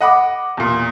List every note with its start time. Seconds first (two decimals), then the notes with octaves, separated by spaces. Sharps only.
0.01 D#5 F#5 B5 D6
0.57 E2 A#2